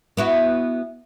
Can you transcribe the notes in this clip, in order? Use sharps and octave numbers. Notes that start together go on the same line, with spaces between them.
B3 E4 F#4